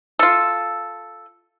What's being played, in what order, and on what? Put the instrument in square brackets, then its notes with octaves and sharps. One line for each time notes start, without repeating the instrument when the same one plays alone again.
[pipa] F4 A4